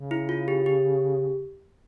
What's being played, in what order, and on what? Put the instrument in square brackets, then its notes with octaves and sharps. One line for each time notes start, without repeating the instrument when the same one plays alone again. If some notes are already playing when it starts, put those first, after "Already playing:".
Already playing: [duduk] C#3
[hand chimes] E4
F4
G4
G4